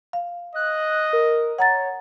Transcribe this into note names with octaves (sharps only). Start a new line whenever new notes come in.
F5
D#5 F#6
A#4
C#5 F#5 A#5 A6